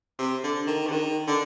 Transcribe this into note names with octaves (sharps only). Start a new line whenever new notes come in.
C3
D3
D#3
D3
D#3
D3